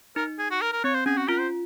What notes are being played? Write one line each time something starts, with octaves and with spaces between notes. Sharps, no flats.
D#4 A#4
G#4
F#4
A#4
A#4
C4 C#5
C5
C#4 G#4
F#4
F4 A#4
C5